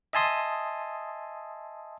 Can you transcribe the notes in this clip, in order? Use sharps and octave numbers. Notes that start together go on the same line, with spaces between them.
D#5 E5 G#5 A5 C6 D#6